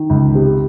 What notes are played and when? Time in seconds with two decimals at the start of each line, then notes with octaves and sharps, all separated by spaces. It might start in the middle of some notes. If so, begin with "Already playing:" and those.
Already playing: D#3
0.10 C#2
0.35 C3